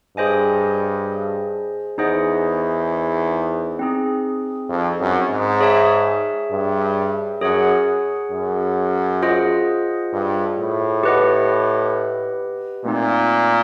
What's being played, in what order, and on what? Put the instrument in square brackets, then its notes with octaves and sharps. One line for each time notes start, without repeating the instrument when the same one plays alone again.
[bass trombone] G2 [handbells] G#4 C5 D#5 G#5
[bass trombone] E2 [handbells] D#4 G#4 C5 D#5 F#5
[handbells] C4 D#4 G#4
[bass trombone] F2
F#2
G#2
[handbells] G#4 C#5 E5 A5
[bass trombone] G2
[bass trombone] F#2 [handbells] G#4 C#5 F#5
[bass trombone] F#2
[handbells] F4 G#4 C5 D#5 F#5
[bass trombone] G2
A2
[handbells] G4 B4 D#5 F#5
[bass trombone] A#2 [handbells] A3 C4 D#4